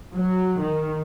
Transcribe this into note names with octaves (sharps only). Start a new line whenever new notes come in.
F#3
D#3